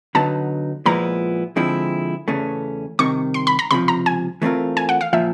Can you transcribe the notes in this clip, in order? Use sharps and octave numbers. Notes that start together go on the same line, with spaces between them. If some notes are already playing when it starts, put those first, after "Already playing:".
D3 F#3 B3 D#4 A5
A#2 F3 G#3 B3 E4 A#5
D3 F3 G#3 C4 E4
E2 C#3 E3 A3 C#4
C2 C3 D#3 C#6
C6
B5
A#5
C#2 C3 F3 B5
A#5
G#5
E3 A3 C4 F4 A#4
G#5
F#5
F5
A#2 F3 E5